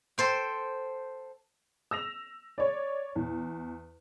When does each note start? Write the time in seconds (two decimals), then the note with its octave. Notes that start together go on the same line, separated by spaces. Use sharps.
0.18 A4 C5 G5
1.91 E6 A#6 F7
2.58 C#5 D5
3.16 E2